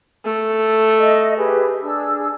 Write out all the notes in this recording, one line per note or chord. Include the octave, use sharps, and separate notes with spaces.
A3
D#5 E5
G4 G#4 B4
D4 G#4 E6